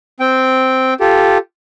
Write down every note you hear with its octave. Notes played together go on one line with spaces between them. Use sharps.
C4 G5
F4 G4 A4